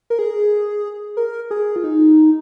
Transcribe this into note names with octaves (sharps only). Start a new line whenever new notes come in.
A#4
G#4
A#4
G#4
F4
D#4